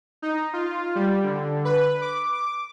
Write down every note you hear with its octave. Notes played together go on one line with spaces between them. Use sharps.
D#4
F4
G3
D3
B4
D6
D6